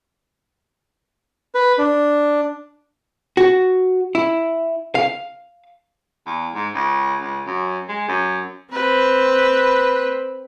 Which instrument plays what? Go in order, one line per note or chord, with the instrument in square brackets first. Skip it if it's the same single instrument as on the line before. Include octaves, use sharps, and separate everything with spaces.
[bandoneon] B4
D4
[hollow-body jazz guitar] F#4
E4
F5
[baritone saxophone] E2
G#2
C#2
C#2
F#2
G#3
F#2
[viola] C4 [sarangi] B4